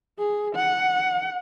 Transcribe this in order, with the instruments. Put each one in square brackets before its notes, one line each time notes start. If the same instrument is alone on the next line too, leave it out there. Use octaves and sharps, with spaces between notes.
[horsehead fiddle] G#4
F#5